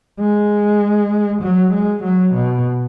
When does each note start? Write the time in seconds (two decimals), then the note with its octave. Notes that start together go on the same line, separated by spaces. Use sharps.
0.20 G#3
1.42 F#3
1.73 G#3
2.04 F#3
2.34 B2